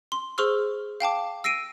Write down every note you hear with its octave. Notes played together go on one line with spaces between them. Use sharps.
C6
G#4 C5 C6 C#6 E6 F6
F5 G5 A5 D6
E6 A#6 C7 D7 D#7